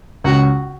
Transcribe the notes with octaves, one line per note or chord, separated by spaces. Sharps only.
C#2 C#3 F#4